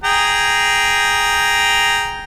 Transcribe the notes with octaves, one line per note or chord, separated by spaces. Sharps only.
G#4 G5 A#5